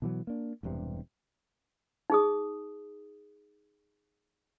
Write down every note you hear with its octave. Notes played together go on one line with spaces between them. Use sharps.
B2 E3 F#3
A#3 D4
E1 E2 G2 C3
D#4 G#4 D#6